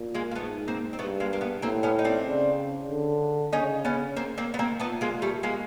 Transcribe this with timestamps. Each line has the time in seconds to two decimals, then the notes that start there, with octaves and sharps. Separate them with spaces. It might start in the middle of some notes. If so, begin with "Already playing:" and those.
Already playing: A#2
0.15 G#3 A#3
0.31 A#3
0.35 G#2 A3 B3
0.68 A#3 C4
0.93 C4
0.99 G2 A3 B3
1.20 G#3 A#3
1.33 A#3
1.41 A3 B3
1.62 A2 A#3 C4
1.83 B3 C#4
1.99 D#4
2.05 C4 D4
2.26 C#3
2.89 D3
3.53 C#3 C#4 D#4
3.85 B3 C#4
4.16 A#3 C4
4.38 A#3 C4
4.54 B3
4.59 A#3 C4
4.80 A#2 A3 B3
5.01 G#3 A#3
5.22 G3 A3
5.43 G#3 A#3